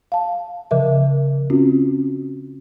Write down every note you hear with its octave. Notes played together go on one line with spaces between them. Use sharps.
F5 A5
C#3 F3 A#4 D#5 E5
C4 C#4 F4 F#4